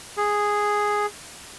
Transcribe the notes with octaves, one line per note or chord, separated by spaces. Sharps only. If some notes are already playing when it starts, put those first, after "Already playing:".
G#4